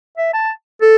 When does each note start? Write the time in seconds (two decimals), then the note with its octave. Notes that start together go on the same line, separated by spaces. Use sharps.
0.18 E5
0.34 A5
0.82 A4